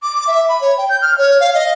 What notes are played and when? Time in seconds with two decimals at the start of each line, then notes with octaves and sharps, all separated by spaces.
0.03 D6
0.27 E5
0.49 B5
0.61 C#5
0.78 G5
0.90 G6
1.02 F6
1.18 C#5
1.40 F5
1.54 D#5